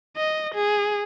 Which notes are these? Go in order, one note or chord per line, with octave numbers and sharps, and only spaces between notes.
D#5
G#4